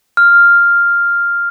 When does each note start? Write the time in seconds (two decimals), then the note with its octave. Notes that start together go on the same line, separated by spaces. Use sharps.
0.17 F6